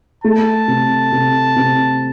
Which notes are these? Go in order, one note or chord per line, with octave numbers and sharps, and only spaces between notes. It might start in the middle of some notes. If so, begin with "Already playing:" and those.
A3 A5
C3
C3
C3